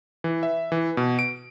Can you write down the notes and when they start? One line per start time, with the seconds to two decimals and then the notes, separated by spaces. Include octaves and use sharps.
0.24 E3
0.43 E5
0.72 E3
0.97 B2
1.19 D7